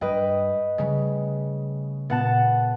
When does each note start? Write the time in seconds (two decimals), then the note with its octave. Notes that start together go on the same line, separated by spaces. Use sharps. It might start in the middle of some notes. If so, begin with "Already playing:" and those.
0.01 G2 B4 D#5 G5
0.78 C#3 G3 A3
2.10 A#2 B3 F#5 A5